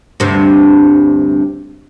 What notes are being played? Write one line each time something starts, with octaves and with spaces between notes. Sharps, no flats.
D2 G2 C3